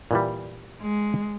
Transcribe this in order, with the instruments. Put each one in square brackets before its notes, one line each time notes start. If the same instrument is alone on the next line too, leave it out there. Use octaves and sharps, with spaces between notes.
[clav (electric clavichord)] A#2 E3 G3
[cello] G#3